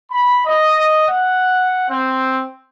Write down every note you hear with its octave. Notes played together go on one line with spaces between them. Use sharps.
B5
D#5
F#5
C4